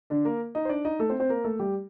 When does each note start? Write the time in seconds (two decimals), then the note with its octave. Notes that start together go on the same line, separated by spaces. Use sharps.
0.10 D3 D4
0.25 A#3 A#4
0.55 D#4 D#5
0.65 C5
0.69 D4 D5
0.85 D#4 D#5
0.99 A3 A4
1.09 C4 C5
1.20 C4 C5
1.29 A#3 A#4
1.44 A3 A4
1.59 G3 G4